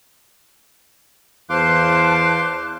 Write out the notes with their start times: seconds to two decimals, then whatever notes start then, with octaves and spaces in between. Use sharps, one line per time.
1.50 E2 C5 F5 A5 C6 D6 F#6